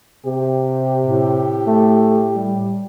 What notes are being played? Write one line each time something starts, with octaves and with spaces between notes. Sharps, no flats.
C3 G4
A2
A3
G3